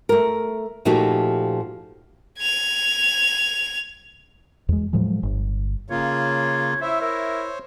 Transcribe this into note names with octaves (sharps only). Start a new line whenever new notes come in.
A3 A#4
A#2 F3 A3 D#4 F#4 G4
G#6 F7
E2 G#3
A2 F3 F#3 G#3
G1
C#3 A#3 F4 C#5
E4 C5 C#5 E5
E4 A#4